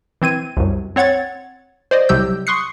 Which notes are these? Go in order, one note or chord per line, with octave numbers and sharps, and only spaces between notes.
E3 C4 G#6 D#7
C2 F#2
C4 C#5 F#5 G#6 A6
C5 D5 D#5
C2 C3 F#3 G4 E6 G6
C6 C#6 D#6 F#6 C7 C#7